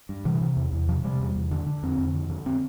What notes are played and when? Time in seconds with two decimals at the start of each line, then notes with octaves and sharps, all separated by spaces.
0.09 G2
0.25 C3 E3
0.41 C3
0.57 E2
0.73 E2
0.88 C3 F3
1.03 C3 G3
1.20 E2
1.36 E2
1.51 D3
1.66 D3
1.83 F2 C4
1.98 F2
2.14 D3
2.30 D3
2.46 C4